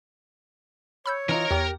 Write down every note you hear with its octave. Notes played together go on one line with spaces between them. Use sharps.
C#5 B5 E6 G6
E3 D#4 F4 A#4 A#5
E2 G4